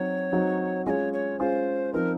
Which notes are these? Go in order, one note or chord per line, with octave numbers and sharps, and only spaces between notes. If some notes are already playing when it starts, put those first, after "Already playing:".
Already playing: F#3 C4 D#4 F#4 C#5
F#3 C4 D#4 F#4
G#3 C#4 F4 C#5 D#5
C#5
G#3 C#4 F4 C5
F3 C4 D#4 A#4